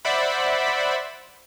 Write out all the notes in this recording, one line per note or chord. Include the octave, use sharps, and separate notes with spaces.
C5 D5 E5 F#5 B5